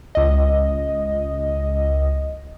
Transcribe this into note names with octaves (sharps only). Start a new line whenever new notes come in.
C#2 D#5